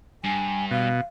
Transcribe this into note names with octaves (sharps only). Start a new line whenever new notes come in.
G2 G#5
B2 F5